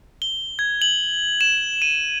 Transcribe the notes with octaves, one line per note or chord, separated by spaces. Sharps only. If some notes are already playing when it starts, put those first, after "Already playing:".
G7
G#6
F#7
E7
D#7